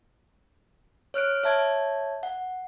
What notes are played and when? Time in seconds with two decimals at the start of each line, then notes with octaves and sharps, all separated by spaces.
1.14 C#5 F6 F#6 D7
1.44 C#5 E5 A5 G#6
2.23 F#5